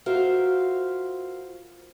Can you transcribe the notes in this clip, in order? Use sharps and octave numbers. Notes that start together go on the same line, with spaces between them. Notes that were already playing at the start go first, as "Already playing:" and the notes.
F4 F#4 A#4 C5 E5 F5